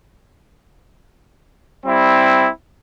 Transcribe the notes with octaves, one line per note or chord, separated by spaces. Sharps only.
G3 C4 E4